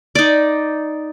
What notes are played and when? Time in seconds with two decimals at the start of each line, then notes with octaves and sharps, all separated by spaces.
0.15 D#4 D5